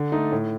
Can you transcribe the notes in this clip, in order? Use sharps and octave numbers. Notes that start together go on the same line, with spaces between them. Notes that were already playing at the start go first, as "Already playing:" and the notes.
Already playing: D3
A3 D#4
A2